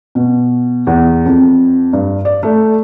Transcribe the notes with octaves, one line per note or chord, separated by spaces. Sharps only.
B2
E2
F2
G2
D5
A3